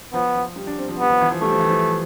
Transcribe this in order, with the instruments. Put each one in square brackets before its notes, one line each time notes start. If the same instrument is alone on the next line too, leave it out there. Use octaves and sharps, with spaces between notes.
[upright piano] F3 [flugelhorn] B3
[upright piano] F3
G3
D4
C4
F3
[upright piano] G3 [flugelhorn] B3
[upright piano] F3
E3
F3
[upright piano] G3 [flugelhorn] A3
[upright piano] F3
E3
F3